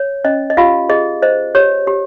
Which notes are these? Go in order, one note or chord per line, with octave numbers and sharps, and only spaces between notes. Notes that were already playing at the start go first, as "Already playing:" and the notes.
Already playing: C#5
C#4 D#5
D#5
F4 G4 F5
G#4 D#5
C5 D#5
G4 C#5
G4